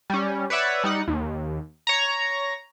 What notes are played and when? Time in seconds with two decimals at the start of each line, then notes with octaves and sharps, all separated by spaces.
0.10 G3 C#4
0.50 B4 C#5 D5 E5 F#5
0.84 G3 D#4 F#5
1.08 D#2
1.87 C#5 A#5